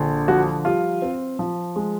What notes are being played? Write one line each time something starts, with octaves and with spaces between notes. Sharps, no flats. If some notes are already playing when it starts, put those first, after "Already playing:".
Already playing: A#1 D3
F3 F#4
G3 F4
C4
F3
G#3